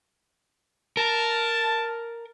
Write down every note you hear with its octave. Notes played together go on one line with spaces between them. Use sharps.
A#4 A5